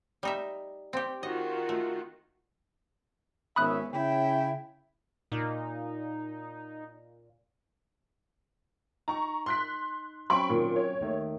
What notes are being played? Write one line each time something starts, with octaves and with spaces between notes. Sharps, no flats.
G3 D#4 E5
C4 G4
D#3 F4 F#4 D#5
A3
G#1 B3 C#4 E5 B5 D#6 F#6
C#3 E4 G5
A#2 D#4
D#4 A#5 C#6
C6 F#6 B6
F#3 C4 C#4 B5 C#6 D7
A#2 D#3
C#5
D#2 D#3 A3